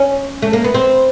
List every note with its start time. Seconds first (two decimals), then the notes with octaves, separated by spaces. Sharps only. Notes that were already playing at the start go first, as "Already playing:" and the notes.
Already playing: C#4
0.42 A3
0.53 A#3
0.64 B3
0.74 C4